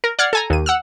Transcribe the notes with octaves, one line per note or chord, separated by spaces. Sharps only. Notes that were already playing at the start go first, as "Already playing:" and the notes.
A#4
D5 F#5 F6 G#6 C7 C#7
A4 G#5 A#5
D#2 D#7
F#5 E6 F6